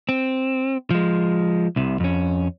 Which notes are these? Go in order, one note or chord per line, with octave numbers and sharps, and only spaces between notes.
C4
F3 G#3
C2 C3
F2 C#4